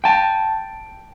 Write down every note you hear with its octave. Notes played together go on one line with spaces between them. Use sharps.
G5 A5